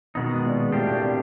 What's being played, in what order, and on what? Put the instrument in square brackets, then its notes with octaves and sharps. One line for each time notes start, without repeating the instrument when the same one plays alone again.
[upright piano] B2 [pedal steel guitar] D#3 G#3 B3 D#4
[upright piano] A#2
[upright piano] A2 [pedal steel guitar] G3 A#3 D4 G4 C5
[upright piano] A#2
C3